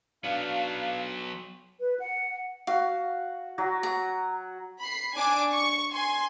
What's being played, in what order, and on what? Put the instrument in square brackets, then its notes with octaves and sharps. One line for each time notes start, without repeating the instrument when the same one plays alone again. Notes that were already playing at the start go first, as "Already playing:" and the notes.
[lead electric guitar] F#3 B3 [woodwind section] D4 F5
[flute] B4
F#5
[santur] F#4 [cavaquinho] F5
[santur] F#3 F#4
[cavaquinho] A#5
[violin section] B5 C7
D4 G#5 D6
C#6
G#5 C6